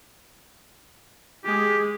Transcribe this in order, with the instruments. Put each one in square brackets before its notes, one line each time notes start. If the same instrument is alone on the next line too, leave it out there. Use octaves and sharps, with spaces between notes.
[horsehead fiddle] G#3 G#4 [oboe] G4